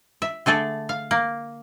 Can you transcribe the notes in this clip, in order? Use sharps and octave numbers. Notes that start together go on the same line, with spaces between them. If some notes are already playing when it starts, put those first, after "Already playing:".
E5
D3 A3 G#4 A4
F5
A#3